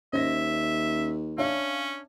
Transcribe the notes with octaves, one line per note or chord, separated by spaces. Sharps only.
D#2 C#4 C5 D#5 E5 A#6
C#4 D4 C#5 E5 F5